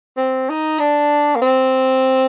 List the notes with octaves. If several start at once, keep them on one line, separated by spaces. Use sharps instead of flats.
C4
D#4
D4
A#3
C4